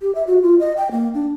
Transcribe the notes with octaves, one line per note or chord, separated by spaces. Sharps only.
G4
E5
F#4
F4
D#5
G5
A#3
D4